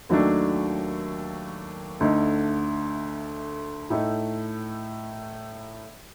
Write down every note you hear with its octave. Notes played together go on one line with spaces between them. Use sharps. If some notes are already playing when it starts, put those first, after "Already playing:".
D#2 D#3 F#3 A3 D4
D2 D3 A3 D#4
A2 A3 D#4